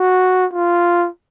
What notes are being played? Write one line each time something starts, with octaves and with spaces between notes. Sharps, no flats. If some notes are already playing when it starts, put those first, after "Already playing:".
Already playing: F#4
F4